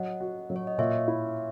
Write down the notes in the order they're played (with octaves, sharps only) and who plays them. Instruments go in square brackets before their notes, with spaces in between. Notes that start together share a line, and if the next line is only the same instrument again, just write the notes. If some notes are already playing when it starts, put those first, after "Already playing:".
Already playing: [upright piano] F#3 F#4 [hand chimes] D#5 F#5
[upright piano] F#4
F#3
[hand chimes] C#5
D#5
[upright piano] A#2 [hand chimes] C#5 E5
[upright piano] E4